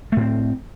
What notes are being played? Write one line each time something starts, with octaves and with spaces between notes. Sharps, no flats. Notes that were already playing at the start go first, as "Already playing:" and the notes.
A2 A3 C4